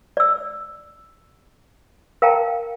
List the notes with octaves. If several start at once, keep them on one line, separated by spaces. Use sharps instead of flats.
D5 E6
A#4 F5 G5 A5 A#5